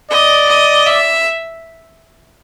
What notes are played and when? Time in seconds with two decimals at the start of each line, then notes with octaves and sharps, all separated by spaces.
0.11 D5 D#5
0.48 D#5
0.86 E5